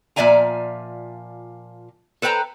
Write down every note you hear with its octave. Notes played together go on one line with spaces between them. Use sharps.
A#2 F3 D5 E5 G#5 A#5
A4 B4 C5 G5 A#5